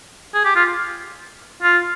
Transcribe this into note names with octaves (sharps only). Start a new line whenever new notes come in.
G#4
G4
F4
F4